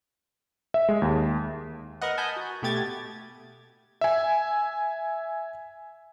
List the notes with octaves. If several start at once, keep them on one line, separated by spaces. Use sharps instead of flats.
E5
G#3
D#2
A#4 B4 D#5 F#5
G#5 A5 B5 D#6 G6
F#4
B2 A3 G4 G#6 A6
E5 G#5